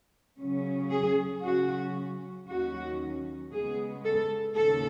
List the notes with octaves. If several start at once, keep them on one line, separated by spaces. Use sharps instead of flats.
C#3 F#3 C#4
G#4
C#3 F#3 C#4 F#4
D#2 D#3 F#3 C#4 F#4
C#3 G#3 B3 G#4
A4
D#2 C#3 A4